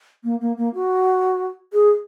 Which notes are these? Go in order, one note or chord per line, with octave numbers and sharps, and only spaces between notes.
A#3
A#3
A#3
F#4
G#4